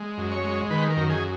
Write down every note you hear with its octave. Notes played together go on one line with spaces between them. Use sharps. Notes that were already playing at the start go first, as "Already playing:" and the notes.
Already playing: G#3
F#2
C#5
G#3
D#3 B4
A#4
F#2
G#4